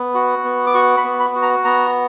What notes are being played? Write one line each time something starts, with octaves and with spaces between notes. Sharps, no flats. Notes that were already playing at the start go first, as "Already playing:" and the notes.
Already playing: B3
F#4
B3
D6
F#4 C#6
B5
B3
B5
F#4
A#5
B3 A#5